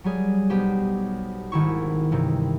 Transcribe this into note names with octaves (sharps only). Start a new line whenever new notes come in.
F#3 G3 G#4
B1 B3 G4 C5
G#1 D#3 E4 C#6
G2 C3 D#3 E3